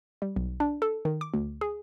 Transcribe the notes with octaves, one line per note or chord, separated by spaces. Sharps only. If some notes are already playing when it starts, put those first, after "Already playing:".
G3
B1
D4
A4
D#3
D6
D2
G#4